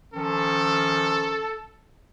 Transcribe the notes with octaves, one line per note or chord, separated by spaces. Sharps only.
D#3 F3 C#4 A4